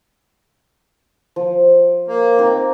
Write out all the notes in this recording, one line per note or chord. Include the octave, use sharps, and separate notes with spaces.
F3
A#3
C4 D#4